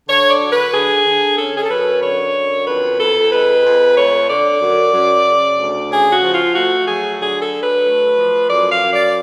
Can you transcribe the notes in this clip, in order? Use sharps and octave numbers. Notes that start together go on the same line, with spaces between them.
D3 C#5
D5
F#3
B4
D3 G#4
D3
C#4 A4
G#4
A4
F#2 B4
D3 C#5
F#2
F2 B4
F2 A4
G#3 B4
F2
A3 C#5
D3 D5
F#2
F#2
C#3
D2
C#3 G#4
F#4
F3
F4
A3 F#4
F#3 G#4
D3 G#4
A4
F#3
B4
A3
F3
F#2 D5
F5
F#2
D5